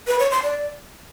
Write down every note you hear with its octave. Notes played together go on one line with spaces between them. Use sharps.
B4
C#5
C6
D5